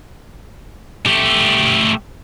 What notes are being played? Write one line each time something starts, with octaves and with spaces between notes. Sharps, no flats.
A3 G4